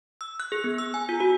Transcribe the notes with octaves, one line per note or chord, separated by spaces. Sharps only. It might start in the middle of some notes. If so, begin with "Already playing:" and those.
E6
F#6
G#4
B3
E6
G#5
F4
F#4